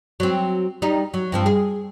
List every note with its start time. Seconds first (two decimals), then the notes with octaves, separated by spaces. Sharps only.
0.20 F#3 C4
0.82 G3 D#4
1.14 F#3
1.32 G2 F3 C4
1.46 G#4